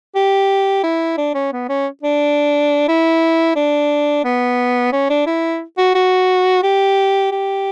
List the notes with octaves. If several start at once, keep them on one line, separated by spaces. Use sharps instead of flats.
G4
E4
D4
C#4
B3
C#4
D4
E4
D4
B3
C#4
D4
E4
F#4
F#4
G4
G4